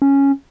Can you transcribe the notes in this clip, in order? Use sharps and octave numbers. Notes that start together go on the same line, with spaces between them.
C#4